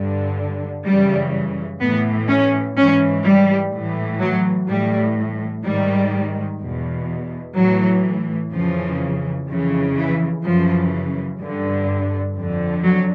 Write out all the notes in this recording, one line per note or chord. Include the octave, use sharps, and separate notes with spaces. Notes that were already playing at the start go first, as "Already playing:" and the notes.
Already playing: G2 D3
F#2 C#3 E3 G3
A2 E3 B3
C#4
G#2 E3 C#4
G3
A2 E3
F#3
A2 E3 G3
G#2 D#3 G3
E2 B2
A2 E3 F#3
F2 C#3 E3 F3
F2 C#3 E3
E3
F#2 C#3 E3 F3
G2 D3
F2 D3
F#3